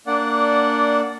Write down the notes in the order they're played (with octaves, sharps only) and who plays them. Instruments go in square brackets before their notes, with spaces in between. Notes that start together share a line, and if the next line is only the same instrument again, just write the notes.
[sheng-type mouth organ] A#3 D4 D5 F#5